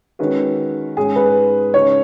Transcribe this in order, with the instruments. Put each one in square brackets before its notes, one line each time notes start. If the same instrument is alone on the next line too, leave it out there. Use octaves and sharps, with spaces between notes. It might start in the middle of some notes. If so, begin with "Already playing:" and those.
[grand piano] D#3 G#3 C#4 F#4 B4
[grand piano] G#2 G#3 C#4 [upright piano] G#4
[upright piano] B4
[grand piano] C#3 G#3 D#4 [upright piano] C#5